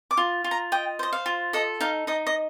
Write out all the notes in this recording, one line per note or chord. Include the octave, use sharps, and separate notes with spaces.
D6
F4
F4
A#5
D#5 G5
C5 D#5
F5
F4
A4 D#5
D#4 F5
D#4 D#5
D#5